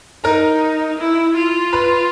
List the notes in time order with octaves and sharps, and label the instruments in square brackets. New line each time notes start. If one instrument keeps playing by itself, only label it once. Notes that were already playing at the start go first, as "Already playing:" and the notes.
[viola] D#4 [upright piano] A#4 A#5
[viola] E4
F4
[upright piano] B4 B5